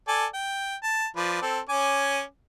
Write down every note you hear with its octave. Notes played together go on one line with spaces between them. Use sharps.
A4 D5 G#5
G5
A5
F3 B4 D5
C4 A4
C#4 G#5 D6